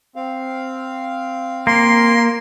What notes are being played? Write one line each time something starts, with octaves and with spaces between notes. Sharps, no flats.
C4 F5
A#3 C6